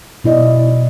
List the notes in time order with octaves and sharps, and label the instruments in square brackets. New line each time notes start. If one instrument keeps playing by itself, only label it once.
[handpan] B2 E4 D5 D#5